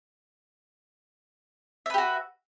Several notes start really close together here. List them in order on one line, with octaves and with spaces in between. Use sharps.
E5 B4 G4 F#4